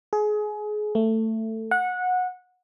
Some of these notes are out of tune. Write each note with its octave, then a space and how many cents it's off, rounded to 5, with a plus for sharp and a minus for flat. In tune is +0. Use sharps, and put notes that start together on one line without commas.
G#4 +25
A3 +15
F#5 -20